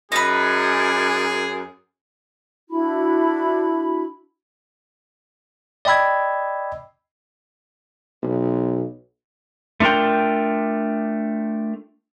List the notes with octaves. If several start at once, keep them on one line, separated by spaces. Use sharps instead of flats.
F#2 D#4 G#4 B4
D4 E4 F#4 B5
D5 D#5 G5 B5 E6 G#6
B1
A3 D4 F4 A#4 G5